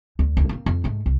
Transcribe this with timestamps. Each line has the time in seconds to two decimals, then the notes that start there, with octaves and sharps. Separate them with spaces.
0.19 D2
0.37 D2 E4
0.49 A#3 C4
0.66 F2
0.84 G#2 A3
1.06 C2